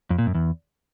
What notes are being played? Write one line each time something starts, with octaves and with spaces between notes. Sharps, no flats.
F2
A#2
F#2
E2